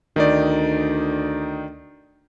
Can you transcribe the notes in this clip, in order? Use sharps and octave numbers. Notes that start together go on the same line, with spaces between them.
D2 D#3 D#4 D5